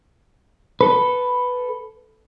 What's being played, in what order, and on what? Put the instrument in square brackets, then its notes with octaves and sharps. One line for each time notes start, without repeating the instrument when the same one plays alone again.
[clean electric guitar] A4 B4